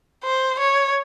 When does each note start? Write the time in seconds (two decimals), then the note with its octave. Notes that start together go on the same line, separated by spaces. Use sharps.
0.24 C5
0.59 C#5